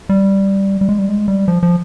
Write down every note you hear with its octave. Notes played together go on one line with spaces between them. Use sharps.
G3
G3
G#3
G3
G#3
G3
F3
F3